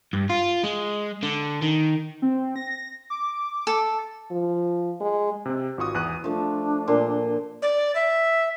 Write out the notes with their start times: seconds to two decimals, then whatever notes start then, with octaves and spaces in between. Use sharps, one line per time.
0.13 G2
0.30 F4
0.64 G#3
1.23 D3
1.63 D#3
2.22 C4
2.56 A#6
3.10 D6
3.67 A4
4.31 F3
5.01 G#3
5.45 C3 C4
5.78 G#1 F4 F#4 C#6 D#6
5.94 E2 E3 F#6 D#7
6.24 F3 A3 D4
6.88 A#2 C6
7.62 D5
7.95 E5